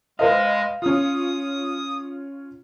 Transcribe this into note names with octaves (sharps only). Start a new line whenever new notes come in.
G#3 B4 C5 D#5 F5
C#4 F4 D#6